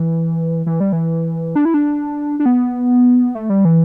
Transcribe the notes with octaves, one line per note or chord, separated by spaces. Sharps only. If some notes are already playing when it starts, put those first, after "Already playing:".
Already playing: E3
E3
G3
E3
D4
E4
D4
D4
B3
A3
G3
E3